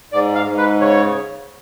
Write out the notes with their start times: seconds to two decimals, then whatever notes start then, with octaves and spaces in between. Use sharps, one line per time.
0.13 G#2 D5
0.35 F5
0.46 G#2
0.58 B4
0.81 C#3 C#5